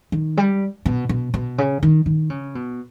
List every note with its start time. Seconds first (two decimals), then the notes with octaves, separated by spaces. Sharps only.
0.12 D#3
0.37 G3
0.86 B2
1.09 B2
1.34 B2
1.58 C#3
1.83 D#3
2.06 D#3
2.30 C#3
2.55 B2